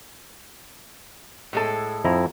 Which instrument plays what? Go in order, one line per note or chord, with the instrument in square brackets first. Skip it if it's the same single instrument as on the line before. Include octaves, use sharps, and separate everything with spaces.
[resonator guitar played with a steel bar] A2 G#3 A4
[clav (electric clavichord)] F2 E4 A#5